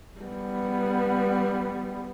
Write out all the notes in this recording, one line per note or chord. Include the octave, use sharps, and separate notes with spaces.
G3 B3